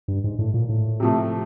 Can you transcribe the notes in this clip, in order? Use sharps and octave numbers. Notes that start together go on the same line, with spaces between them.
G2
G#2
A2
A#2
A2
C3 F3 A3